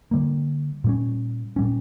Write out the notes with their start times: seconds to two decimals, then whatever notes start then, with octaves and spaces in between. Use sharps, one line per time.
0.11 D3 G3 A#3
0.84 A#2 G3 C#4
1.56 A#2 G3 C#4